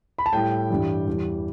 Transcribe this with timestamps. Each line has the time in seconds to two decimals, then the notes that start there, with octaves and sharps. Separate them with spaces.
0.19 B5
0.26 A5
0.32 A2 G3 G5
0.70 G2 E3 G3
1.07 E2 E3 G3